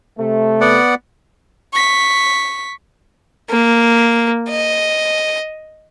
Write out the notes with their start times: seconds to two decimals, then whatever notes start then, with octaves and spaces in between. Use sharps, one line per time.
0.18 C3 A3
0.61 B3 D5 F#5
1.73 C#6 B6
3.50 A#3
4.50 D#5